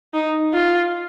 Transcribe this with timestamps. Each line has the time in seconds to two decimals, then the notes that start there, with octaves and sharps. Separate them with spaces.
0.14 D#4
0.53 F4